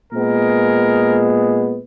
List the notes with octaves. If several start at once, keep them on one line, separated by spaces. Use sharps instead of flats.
A#2 G#3 B3 A#4